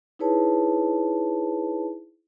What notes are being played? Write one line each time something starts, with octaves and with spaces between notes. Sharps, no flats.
D#4 E4 G#4 B4 C#5 A5